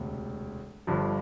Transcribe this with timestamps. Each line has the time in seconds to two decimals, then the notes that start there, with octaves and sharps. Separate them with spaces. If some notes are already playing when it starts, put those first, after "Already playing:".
Already playing: E1 D2 C3
0.87 G1 G2 F3